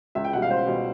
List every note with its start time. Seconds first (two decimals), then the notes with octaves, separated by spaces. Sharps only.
0.15 C#2 E5
0.24 G5
0.33 B2 G3 F#5
0.42 F5
0.50 C#2 C5
0.67 B2 G3